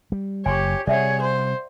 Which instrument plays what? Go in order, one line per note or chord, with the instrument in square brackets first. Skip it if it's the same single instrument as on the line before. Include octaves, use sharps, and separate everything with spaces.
[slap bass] G3
[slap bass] F#1 [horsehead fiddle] G4 C#5 [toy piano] G#5 C6 C#6
[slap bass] C3 G3 [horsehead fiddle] G#4 C#5 [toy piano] D5 E5 F#5
[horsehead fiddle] C5